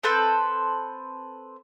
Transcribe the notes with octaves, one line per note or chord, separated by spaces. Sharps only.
C4 A4 B4 C5